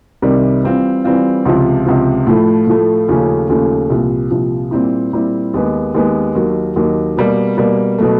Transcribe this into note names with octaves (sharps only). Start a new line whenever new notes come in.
C2 C3 D#3 G3
E3 G3 C4 F4
E3 G3 C4 F4
C#2 C3 F3
C#2 C3 F3
A2 F3 A3
A2 F3 A3
D#2 C#3 F3 A3 C#4
D#2 C#3 F3 A3 C#4
C2 A#2 F3
C2 A#2 F3
A#2 G3 C4 E4
A#2 G3 C4 E4
D#2 D#3 G#3 B3
D#2 D#3 G#3 B3
D#2 D#3 F#3
D#2 D#3 F#3
B2 G3 A#3
B2 G3 A#3
B2 F#3 A3